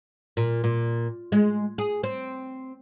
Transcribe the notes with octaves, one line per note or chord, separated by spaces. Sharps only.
A#2
A#2
G#3
G#4
C4